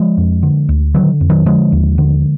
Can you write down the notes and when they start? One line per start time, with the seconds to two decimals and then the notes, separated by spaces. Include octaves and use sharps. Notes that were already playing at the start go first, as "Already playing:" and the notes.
Already playing: F3 G#3
0.17 F2
0.43 D3
0.69 D2
0.94 D3 D#3 F#3
1.21 F2
1.30 D#3 F#3
1.46 D3 F3 G#3
1.72 D#2
1.98 D3